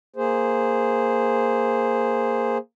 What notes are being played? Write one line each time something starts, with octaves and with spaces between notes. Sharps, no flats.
A#3 G#4 C5